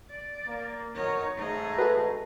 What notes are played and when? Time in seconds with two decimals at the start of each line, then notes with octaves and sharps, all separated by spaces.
0.10 D5
0.46 A#3
0.95 B1 D#4 F#4 A#4 C#5
1.37 G#2 A3 D#4 G#4
1.78 F#4 A4 B4